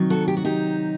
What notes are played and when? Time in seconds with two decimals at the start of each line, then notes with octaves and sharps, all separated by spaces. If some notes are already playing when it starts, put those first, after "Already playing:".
Already playing: C3 D#3 F#3
0.10 F#4 A4
0.28 G4
0.37 F#4
0.45 D#4 G4